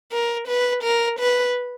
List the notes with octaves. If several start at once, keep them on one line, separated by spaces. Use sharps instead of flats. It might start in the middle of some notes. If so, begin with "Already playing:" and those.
A#4
B4
A#4
B4